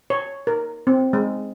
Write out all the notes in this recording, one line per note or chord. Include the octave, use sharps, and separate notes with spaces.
C#5
A#4
C4
G#3